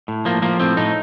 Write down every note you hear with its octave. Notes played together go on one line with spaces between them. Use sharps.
A2
F3 A#3
F3 A#3
A2 C4
A2 D#4